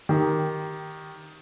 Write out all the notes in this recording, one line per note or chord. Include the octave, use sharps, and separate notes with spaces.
D#3 G4